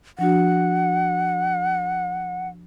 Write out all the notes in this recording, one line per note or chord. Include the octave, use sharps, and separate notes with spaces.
F3 D4 F#4 F#5